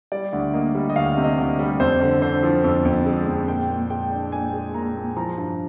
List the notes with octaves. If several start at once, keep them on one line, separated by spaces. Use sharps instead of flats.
G3 D5
D2
A#3 D#5
G3
D#5
D2 F5
C3
D#5
D2
G3
F2 C5
D3
D3 C5
F3
F2
F2
G#3
F2
A#2 G5
A#2
G#3 G5
D4
A#2 G#5
G#3
A#2 A#5
A#2
F3 A#5
G2